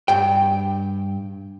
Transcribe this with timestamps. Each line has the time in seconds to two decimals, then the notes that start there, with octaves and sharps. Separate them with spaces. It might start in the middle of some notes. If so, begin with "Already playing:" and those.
0.08 G2 G5